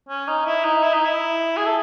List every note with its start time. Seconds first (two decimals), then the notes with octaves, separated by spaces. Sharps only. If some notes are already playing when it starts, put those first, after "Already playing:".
0.09 C#4
0.28 D#4
0.46 E4
0.65 D#4
0.84 E4
0.94 D#4
1.05 E4
1.57 G#4
1.66 A4